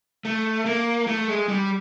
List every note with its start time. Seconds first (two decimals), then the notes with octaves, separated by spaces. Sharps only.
0.25 A3
0.66 A#3
1.07 A3
1.28 G#3
1.48 G3